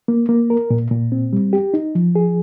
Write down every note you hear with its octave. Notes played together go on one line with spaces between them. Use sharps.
A#3
A#3
A#4
A#2
A#2
C4
G3
G4
D#4
F3
G#4